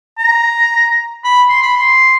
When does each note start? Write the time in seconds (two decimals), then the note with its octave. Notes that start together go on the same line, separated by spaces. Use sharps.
0.18 A#5
1.24 B5
1.50 C6
1.63 B5
1.76 C6